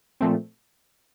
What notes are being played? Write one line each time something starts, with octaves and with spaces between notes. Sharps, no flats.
A#2 F3 A3 C4